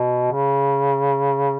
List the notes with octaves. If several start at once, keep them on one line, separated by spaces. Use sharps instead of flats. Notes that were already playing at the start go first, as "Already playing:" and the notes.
Already playing: B2
C#3